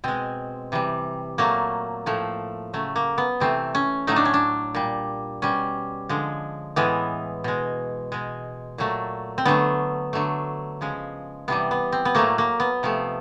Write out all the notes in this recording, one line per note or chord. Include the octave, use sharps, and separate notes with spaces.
B2 G#3 C4
C3 E3 G3
A#2 F#3 A3 A#3
A2 F3 A3
C#3 F#3 A3
A#3
B3
C3 E3 A3 C4
C#4
A2 F#3 A3 D#4
D4
C#4
D4
A#2 G3
B2 G3 C#4
D3 F3 G#3
A2 E3 G#3 B3
B2 G#3
B2 G#3
A#2 F#3 A3
C4
D3 F#3 A3 B3
D3 F#3 A3
C#3 F3 G#3
C3 E3 G3 B3
B3
C4
B3
A2 F#3 A3 A#3
A#3
B3
C3 F3 A3